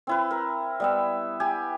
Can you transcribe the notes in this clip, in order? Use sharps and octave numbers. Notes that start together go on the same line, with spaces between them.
C4 E4 B4
A#4
G3 B3 E5
G4 G#5